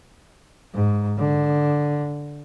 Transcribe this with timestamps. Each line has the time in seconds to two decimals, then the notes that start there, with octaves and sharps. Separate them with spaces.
0.74 G#2
1.18 D3